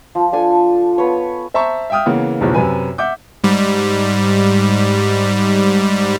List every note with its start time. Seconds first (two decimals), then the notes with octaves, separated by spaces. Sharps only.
0.15 F3
0.32 D4 A4 G#5
0.98 B3 B4 C#5
1.54 C5 E5 A5 A#5 C#6
1.90 E5 F5 G5 D#6 F6
2.06 C#3 E3 A#3 B3
2.41 B1 E2 A2 C#3 E3 F3
2.54 F#2 C3 B4 G#5
2.98 E5 F#5 D6 G6
3.44 G#2 G3